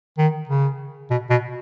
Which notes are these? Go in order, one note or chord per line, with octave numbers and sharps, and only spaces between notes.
D#3
C#3
B2
B2